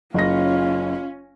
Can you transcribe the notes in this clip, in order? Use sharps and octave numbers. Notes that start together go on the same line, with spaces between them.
F#1 C#4 F4 A#6